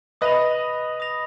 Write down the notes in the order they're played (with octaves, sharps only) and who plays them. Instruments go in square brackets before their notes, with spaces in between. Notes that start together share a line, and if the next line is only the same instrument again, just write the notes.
[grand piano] B4 D#5 [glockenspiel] D#6 A#6 F7
[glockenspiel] D#6 A#6 F7